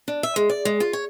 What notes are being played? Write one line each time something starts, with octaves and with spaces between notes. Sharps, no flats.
D4
E5
G#3
D5
G#3
F4
C#5